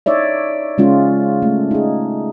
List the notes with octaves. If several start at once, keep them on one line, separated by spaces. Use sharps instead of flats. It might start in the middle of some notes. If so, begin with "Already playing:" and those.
D#4 C#5 D5 E5
C#3 G#3 C#4 F4
A3
D#4 G#4